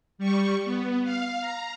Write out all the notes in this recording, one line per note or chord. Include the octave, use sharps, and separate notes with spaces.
G3 C#6
B3
F5
A#5